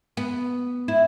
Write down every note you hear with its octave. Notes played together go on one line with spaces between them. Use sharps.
B3
E4